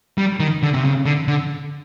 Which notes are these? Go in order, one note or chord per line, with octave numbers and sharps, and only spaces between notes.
G3
D#3
D3
C3
C#3
D3
D3